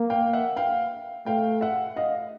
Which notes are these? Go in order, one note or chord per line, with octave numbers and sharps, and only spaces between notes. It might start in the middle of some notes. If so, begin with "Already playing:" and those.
Already playing: A#3
F5 G5
E5 F#5
F5 G5
A3 F5 G5
E5 F#5
D#5 F5